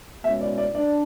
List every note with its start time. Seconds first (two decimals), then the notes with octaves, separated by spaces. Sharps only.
0.24 B2 G#3 C#4 E4 E5
0.41 D5
0.58 D5
0.75 D4 D5